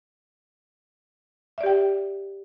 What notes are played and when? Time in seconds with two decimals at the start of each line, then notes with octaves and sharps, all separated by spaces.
1.58 E5
1.61 D5
1.63 G4
1.66 G5